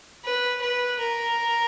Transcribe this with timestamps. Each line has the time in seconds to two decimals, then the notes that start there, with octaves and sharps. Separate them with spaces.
0.24 B4
0.61 B4
0.99 A#4